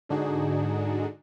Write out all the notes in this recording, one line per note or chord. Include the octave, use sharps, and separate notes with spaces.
G#2 D3 D4 D#4 F#4 G#4